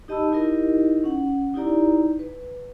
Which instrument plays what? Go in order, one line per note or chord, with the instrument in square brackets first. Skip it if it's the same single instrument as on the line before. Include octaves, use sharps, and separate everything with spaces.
[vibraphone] D#4 G4 D#5 A5 B5 E6
D#4 E4 G4 A#4 D#5
C#4 F#5
D#4 E4 G4 D5 A#5
B4